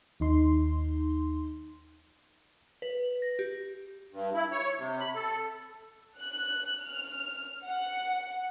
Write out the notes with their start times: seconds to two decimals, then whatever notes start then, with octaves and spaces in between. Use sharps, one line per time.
0.20 D#2 D#4 C6
2.82 B4
3.22 A#6
3.39 G4
4.12 G2
4.34 E4
4.52 C#5
4.78 C3
5.00 B5
5.15 A4
6.18 F#6
6.81 F6
7.66 F#5